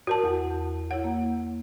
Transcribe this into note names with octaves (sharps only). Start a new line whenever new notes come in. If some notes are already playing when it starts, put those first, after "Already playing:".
F#4 A#4 A5
E2 F#5
E4 C#5 F#5
A#3